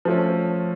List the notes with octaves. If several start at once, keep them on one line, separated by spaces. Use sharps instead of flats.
F3 A3 C#4